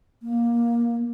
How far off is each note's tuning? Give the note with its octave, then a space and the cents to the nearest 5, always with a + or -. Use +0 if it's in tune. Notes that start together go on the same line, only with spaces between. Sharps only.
A#3 +15